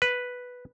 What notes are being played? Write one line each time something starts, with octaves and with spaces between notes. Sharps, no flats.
B4